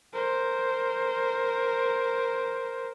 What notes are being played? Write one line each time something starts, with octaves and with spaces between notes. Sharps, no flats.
A#4 C5